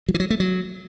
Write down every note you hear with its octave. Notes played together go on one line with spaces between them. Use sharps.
F#3
E3
F#3
A3
F#3